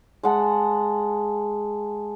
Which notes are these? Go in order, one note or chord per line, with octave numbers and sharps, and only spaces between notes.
G#3 F#5 A5